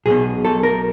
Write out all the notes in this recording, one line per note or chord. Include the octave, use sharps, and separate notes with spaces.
B1 B2 G#4
A4
A#4